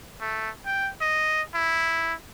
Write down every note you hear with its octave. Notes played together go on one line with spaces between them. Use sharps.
A3
G5
D#5
E4